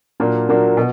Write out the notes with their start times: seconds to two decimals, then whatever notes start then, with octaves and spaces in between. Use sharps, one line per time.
0.20 A#2 F#3 A#3 D4
0.49 A#2 F#3 A#3 D4
0.77 B2